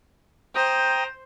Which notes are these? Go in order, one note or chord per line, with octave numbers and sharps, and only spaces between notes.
C5 G5 A#5 D#6